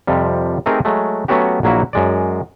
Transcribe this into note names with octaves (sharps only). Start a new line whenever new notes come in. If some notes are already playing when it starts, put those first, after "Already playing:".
F2 C3 F3 G3
A3 C4 D#4 G4 G#4 A#4
F#3 G#3 A3
F#3 A3 B3 C#4 F#4 G4
A#1 F#3 A#3 E4 F#4
F#2 G#3 D5